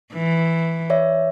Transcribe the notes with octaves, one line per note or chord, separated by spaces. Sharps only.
E3
C#5 D5 E5